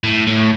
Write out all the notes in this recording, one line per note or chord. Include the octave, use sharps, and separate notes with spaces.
A2
A2